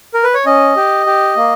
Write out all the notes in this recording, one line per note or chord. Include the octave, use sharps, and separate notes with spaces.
A#4
B4
C#5
C#4 D#5
G4
G4
A#3